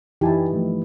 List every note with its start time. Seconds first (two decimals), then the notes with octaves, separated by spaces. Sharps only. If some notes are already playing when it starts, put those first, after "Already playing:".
0.21 F#2 E3 D#4 E4 G4 G#5 A5
0.53 G2 F3 A3